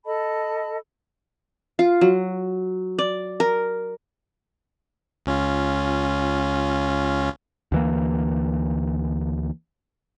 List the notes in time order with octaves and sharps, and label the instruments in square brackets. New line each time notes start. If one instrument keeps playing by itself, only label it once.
[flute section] A4 D#5 A5 B5
[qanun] F4
F#3
D5
A#4
[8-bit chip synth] C#2 C#4 F4
[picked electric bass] D2 E3 A#3